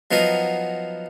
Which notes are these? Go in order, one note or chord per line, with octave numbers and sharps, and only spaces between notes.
F3 F#3 B3 D#4 A#4 F5